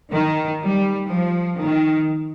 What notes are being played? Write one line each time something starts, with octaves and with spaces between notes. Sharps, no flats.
D#3
G3
F3
D#3